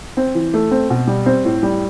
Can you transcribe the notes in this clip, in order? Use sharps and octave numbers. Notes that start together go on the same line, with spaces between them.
C4
E3
A3
C4
B2
G3
C4
A2
G3